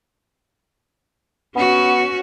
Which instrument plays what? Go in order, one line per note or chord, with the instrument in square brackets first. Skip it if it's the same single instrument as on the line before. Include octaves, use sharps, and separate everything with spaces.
[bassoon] B3 [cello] C#4 F#4